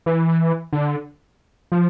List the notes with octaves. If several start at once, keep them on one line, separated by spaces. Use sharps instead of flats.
E3
D3
F3